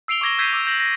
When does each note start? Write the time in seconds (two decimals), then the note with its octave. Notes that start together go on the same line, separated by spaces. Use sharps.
0.08 E6 C7 D7 F7 G7
0.21 C#6 D6 G#6 A#6 G7
0.38 E6 G6 G#6 B6 C7 D#7
0.53 D6 E6
0.67 G6 A#6 F#7
0.80 A#6